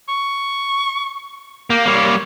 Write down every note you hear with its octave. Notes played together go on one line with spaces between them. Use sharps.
C#6
A#3 G4
G3 A#3 C#5